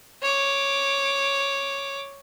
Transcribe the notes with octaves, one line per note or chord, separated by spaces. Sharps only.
C#5 D6